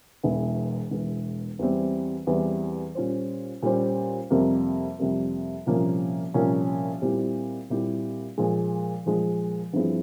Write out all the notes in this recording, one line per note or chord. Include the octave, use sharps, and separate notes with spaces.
E1 E2 E3
E1 E2 E3
E2 E3 G3 C4
E2 E3 G3 C4
A#2 G3 C#4 F4 C5
A#2 G3 C#4 F4 C5
F2 C3 G3 A#3
F2 C3 G3 A#3
C2 A#2 F3 A#3 C#4
C2 A#2 F3 A#3 C#4
A#2 G3 C4 E4 G4
A#2 G3 C4 E4 G4
A#2 F3 G#3
A#2 F3 G#3
G2 F3 C4 E4 G#4